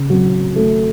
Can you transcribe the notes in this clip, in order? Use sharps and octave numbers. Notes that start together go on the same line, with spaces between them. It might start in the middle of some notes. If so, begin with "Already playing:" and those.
Already playing: C#3
F#3
A3